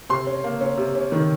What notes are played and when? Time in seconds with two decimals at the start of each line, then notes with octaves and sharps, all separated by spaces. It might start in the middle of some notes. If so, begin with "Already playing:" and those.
0.09 C3 C6
0.27 C#4
0.44 A#3
0.61 C#4
0.77 C3
0.95 C#4
1.12 D#3